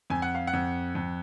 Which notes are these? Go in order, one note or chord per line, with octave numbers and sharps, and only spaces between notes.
F2 G#5
F#5
F5
F#5
F2
F2